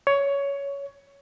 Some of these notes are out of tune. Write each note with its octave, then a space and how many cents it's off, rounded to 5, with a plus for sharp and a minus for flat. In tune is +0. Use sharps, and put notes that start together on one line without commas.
C#5 +15